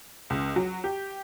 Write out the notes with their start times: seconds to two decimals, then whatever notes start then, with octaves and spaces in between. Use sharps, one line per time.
0.30 C#2
0.56 F#3
0.84 G4